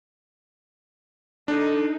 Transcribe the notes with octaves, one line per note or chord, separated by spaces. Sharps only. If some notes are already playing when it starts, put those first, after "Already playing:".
D4 D#4 A4